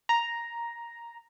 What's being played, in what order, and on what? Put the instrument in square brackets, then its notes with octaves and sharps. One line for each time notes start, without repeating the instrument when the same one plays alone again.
[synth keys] A#5